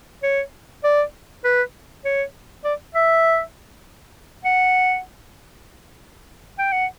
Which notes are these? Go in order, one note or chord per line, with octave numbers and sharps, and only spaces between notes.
C#5
D5
B4
C#5
D5
E5
F#5
G5
F#5